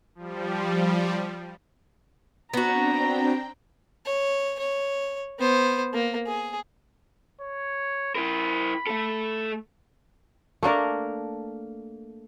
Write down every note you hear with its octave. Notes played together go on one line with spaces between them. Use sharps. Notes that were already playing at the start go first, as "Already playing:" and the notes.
F3 G3
B3 C4 D4 F#4 G5 A#5
C#5
C#5
B3 C5
A#3
G#4
C#5
E4 A#4 B5
A3 A4
A3 A#3 D4 A#4